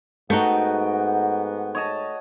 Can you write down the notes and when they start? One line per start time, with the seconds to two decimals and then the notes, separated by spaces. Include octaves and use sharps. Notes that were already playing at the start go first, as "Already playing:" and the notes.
0.30 G#2 A3 B3 D#4 F#4 G5
1.75 C#5 D#5 A5